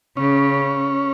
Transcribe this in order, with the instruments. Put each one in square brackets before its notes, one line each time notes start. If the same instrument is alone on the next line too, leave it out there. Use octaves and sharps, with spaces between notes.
[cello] C#3 [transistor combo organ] C#4